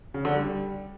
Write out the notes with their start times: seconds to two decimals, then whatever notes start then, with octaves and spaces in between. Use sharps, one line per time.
0.14 C#3
0.25 D3
0.35 G3